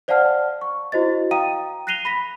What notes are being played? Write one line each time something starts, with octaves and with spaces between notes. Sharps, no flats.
C5 D5 F5 F#5 A5 F6
C#6
E4 F#4 C5 D#5 A6
F5 G5 A#5 D#6 D#7
F#6 A#6 C7 D#7 F7 G7
B5 A#6 B6